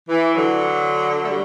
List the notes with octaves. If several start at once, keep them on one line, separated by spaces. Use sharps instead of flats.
E3
D3 F#3
A3
G3